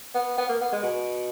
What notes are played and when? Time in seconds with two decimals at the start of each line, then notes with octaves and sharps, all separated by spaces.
0.14 B3
0.38 B3
0.49 A#3
0.61 B3
0.72 G#3
0.83 B2